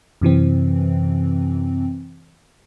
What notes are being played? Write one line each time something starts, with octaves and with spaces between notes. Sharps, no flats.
F#2 C3 E3 C4